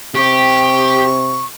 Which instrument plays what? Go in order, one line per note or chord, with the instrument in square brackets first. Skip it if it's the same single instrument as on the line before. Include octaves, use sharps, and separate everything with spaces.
[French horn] C3 [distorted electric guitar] G4 [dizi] C#6